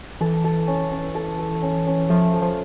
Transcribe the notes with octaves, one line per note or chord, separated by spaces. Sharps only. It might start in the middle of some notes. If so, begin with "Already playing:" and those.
E3 A4
A4
C#4
C#4
A4
A4
C#4
C#4
F3 A3
A3
F3